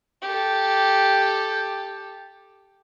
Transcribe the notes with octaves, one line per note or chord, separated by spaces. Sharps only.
G4 A4